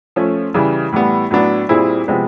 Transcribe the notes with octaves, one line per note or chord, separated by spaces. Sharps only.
F3 A3 C#4
C#3 E3 G3
A2 E3 G3 B3
A2 F#3 B3 D4
A#2 G3 C4 E4 G#4
C3 F3 G#3 B3